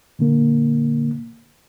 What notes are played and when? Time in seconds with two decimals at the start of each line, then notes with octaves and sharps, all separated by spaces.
0.19 A#2 D3 A#3